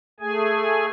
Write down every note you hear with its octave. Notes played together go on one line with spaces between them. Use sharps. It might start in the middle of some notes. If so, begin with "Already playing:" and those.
A3 G#4 G#5